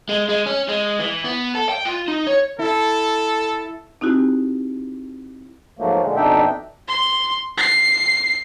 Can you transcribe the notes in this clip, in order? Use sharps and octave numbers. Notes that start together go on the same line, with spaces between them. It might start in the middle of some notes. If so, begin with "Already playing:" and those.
G#3
G#3
C#4
G#3
E3
B3
A4
G5
F4
D#4
C#5
E4 A4
C4 D#4 E4 F#4 G4
G#2 F3 F#3 A3 A#3
A#2 D3 G#3
F2 B2 D4 D#4 E5 G5
C6
C7